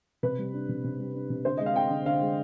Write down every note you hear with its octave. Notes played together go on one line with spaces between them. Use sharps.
C3 B4
G3
D4
C3
C3
G3
D4
C3
D3 C5
G#3 D#5
F5
C4 G5
D3
D3 F5
G#3